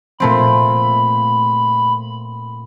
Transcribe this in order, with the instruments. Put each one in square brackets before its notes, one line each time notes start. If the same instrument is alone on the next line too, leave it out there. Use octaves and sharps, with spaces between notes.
[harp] A#2 A3 C4 [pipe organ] B5